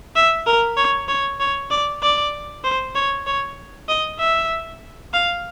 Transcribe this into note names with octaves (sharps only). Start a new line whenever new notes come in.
E5
A#4
C#5
C#5
C#5
D5
D5
C5
C#5
C#5
D#5
E5
F5